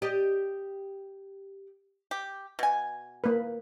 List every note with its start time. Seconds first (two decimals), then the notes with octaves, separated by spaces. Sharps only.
0.02 G4 D5 D#5
2.11 G4
2.59 B2 G#5
3.24 A#3 B4